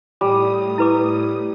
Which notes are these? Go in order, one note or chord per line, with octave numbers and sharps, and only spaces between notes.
A2 G3 D#6
E4 B4 D6